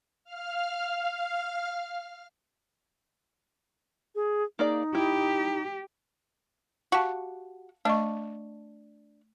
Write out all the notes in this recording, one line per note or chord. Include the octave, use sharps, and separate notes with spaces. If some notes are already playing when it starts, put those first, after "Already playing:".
F5 F6
G#4
A#3 D#4 G#4 D5
E4 G4
F#4 G4 F5 A5
A3 D4 D#5 C#6